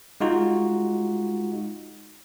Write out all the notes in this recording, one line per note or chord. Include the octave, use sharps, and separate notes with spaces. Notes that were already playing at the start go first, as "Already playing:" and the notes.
G#3 D#4 F4 F#4